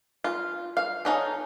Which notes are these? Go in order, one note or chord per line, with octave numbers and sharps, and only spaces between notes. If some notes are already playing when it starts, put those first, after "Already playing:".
F4
F5
C#4 D#4 A4